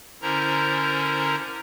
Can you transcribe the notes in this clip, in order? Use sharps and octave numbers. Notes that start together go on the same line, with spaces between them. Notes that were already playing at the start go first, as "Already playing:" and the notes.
D3 C#4 E4 A#4 C5 A#5